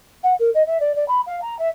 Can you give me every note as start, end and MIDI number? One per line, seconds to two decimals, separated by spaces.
0.23 0.33 78
0.39 0.49 70
0.54 0.62 75
0.66 0.77 76
0.80 0.92 74
0.95 1.06 74
1.08 1.20 83
1.26 1.38 77
1.41 1.57 82
1.58 1.68 76